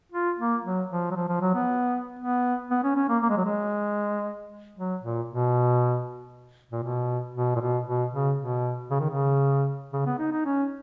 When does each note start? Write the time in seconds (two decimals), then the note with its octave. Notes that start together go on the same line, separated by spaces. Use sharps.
0.12 F4
0.39 A#3
0.64 F#3
0.90 F3
1.11 F#3
1.16 F3
1.29 F3
1.42 F#3
1.54 B3
2.19 B3
2.71 B3
2.84 C#4
2.96 C#4
3.09 A#3
3.23 A#3
3.30 G#3
3.37 F#3
3.45 G#3
4.77 F#3
5.03 A#2
5.28 B2
6.71 A#2
6.83 B2
7.35 B2
7.56 A#2
7.61 B2
7.87 B2
8.13 C#3
8.38 B2
8.91 C#3
9.00 D#3
9.10 C#3
9.93 C#3
10.06 B3
10.19 D#4
10.32 D#4
10.45 C#4